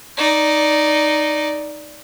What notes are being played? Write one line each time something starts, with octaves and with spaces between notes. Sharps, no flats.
D#4 D5